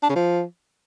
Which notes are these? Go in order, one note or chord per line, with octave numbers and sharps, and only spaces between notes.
D4
C#3
F3